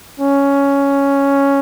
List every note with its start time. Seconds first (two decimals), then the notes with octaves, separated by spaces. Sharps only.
0.20 C#4